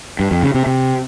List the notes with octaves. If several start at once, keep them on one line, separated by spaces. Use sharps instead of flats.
G2
F2
C#3
C3
C3